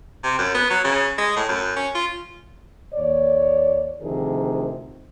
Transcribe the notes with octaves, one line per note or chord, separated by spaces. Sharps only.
C3
F#2
B3
F#3
C#3
G#3
A2
F#2
C#4
F4
D#2 C#5 D5
D2 C3 D#3 F3 G#4 A#4